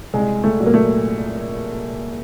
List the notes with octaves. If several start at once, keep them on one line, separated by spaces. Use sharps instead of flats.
C2 G#3
A3
A#2 F#3
A#3
A3